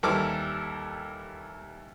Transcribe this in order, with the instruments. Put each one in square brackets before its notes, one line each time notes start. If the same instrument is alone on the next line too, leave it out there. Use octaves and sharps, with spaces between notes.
[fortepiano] D#2 E3 G3 A4 D6 F6